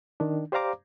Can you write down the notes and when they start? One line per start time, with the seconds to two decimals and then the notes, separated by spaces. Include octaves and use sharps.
0.20 D#3 D4
0.52 G4 C5 D5 F5 A#5 D6